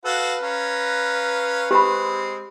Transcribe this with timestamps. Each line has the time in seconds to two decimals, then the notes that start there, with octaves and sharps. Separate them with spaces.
0.05 F#4 A4 B4 F5
0.43 C#4 F5 A#5
1.71 G#3 C4 G4 B5